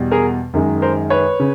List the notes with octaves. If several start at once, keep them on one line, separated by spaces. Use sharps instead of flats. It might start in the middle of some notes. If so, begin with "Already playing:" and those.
Already playing: E2 B2 G3
G#4 A#4
F#2 D#3 G#3
A#4 C5
B4 C#5
C#3